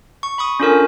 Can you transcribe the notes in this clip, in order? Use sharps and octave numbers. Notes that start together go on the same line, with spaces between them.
C#6
B5 C#6 D#6
C#4 D4 F4 A4 A#4 G#5